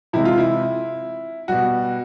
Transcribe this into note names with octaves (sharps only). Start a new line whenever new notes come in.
C3 E3 G#3 E4
F4
E4
B2 G3 F#4